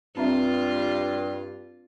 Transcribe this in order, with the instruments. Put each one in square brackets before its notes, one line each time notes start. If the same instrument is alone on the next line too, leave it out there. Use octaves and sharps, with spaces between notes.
[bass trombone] G2 [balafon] C4 D4 E5 [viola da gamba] F4